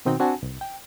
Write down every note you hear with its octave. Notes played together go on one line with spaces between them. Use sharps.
B2 D#3 C4 D#4 F#4 G5
C4 D4 F#4 F#5 G#5 A5
C2
G5